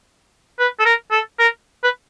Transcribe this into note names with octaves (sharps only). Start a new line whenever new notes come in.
B4
A4
A#4
A4
A#4
B4